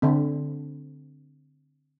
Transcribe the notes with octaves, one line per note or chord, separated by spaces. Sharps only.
D3 C4